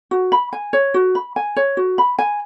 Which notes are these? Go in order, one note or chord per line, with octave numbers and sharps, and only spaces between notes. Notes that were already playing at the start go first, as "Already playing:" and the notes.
F#4
B5
G#5
C#5
F#4
B5
G#5
C#5
F#4
B5
G#5